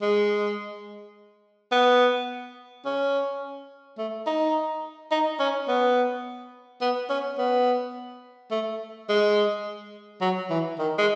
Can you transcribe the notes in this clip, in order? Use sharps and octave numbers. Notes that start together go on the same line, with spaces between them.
G#3
B3
C#4
A3
D#4
D#4
C#4
B3
B3
C#4
B3
A3
G#3
F#3
E3
D#3
G#3